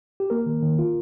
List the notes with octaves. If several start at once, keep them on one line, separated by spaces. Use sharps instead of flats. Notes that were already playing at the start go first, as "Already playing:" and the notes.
G4
A#3 A#4
D#3
D#3
F4